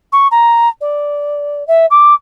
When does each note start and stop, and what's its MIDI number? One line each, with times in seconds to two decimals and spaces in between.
0.12 0.28 85
0.31 0.69 82
0.81 1.66 74
1.68 1.86 76
1.91 2.14 86